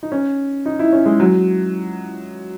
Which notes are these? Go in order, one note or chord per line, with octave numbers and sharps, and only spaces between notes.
D#4
C#4
D#4
E4
C#4
G#3
F#3